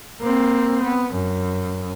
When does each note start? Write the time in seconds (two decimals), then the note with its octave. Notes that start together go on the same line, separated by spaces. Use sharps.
0.21 A#3 C4
0.84 B3
1.14 F#2